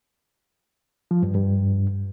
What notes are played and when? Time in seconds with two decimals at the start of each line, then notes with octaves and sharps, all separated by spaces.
1.11 F3
1.23 G2
1.34 G2